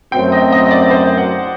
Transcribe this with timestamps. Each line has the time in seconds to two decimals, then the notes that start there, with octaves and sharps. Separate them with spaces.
0.12 F#2 F#3 A3 C4 G5
0.32 D#5
0.52 D#5
0.71 D5
0.90 C5
1.18 F#5